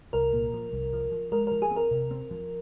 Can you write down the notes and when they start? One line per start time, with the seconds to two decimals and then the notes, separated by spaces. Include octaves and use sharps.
0.13 C2 A#4
0.33 A#2
0.53 F3
0.72 C2
0.93 F3
1.12 F3
1.32 G#3 A#4
1.47 F3 A#4
1.62 G#4
1.71 C4
1.76 A#4
1.91 C3
2.11 C4
2.31 F3